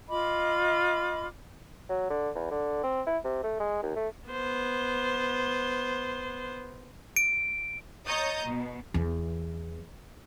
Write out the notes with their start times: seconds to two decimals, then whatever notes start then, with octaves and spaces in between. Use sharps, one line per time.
0.09 F4 D#5 B5 D6
1.89 F#3
2.10 D3
2.35 E2
2.51 D3
2.83 C4
3.06 E4
3.24 C3
3.43 A3
3.60 G#3
3.83 D#2
3.96 A3
4.29 B3 C5
7.16 D7
8.07 C#5 D#5 A#5 D#6 G6 A6
8.45 B2
8.94 E2 E3